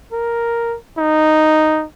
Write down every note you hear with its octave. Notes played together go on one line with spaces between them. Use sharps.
A#4
D#4